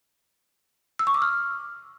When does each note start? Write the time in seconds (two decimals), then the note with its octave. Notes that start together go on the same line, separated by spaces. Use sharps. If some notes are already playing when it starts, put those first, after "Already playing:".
0.99 E6
1.07 C#6
1.14 D6
1.22 F6